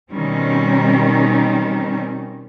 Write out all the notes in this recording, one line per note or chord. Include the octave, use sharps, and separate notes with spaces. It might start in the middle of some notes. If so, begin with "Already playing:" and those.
B2 D#3 G3 C4 C#4